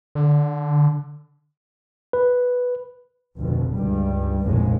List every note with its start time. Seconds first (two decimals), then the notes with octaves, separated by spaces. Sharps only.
0.15 D3
2.13 B4
3.37 F1 D2 B2
3.75 C#2 G2 G3
4.43 F1 A#1 D#2 A2 G#3